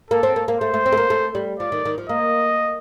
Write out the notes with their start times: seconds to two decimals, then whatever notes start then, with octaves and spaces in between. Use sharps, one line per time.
0.10 A#3 A4
0.23 C4
0.36 A#3
0.48 A#3
0.60 A3 C5
0.74 A3
0.86 C4
0.92 A3
0.97 A#3
1.10 A3
1.35 G3
1.60 F3 D5
1.72 D#3
1.85 D#3
1.98 F3
2.09 A#3 D#5